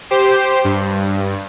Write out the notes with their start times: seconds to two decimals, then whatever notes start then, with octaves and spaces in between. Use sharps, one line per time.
0.11 G4 C5
0.64 G2